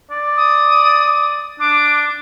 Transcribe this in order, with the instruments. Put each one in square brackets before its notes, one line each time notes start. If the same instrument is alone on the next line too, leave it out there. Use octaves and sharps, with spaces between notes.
[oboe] D5
[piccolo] D#6
[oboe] D4 [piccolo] D6